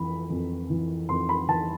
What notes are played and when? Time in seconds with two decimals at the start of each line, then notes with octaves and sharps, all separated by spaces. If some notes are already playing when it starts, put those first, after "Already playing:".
Already playing: F2 E3 B5
0.30 F2
0.70 E3
1.09 F2 C6
1.29 B5
1.48 E3 A5